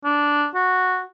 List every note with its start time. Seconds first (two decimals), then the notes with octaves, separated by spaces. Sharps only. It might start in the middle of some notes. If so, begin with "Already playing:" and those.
0.04 D4
0.55 F#4